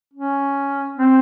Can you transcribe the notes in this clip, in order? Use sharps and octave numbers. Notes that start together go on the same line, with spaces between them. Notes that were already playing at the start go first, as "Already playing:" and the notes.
C#4
C4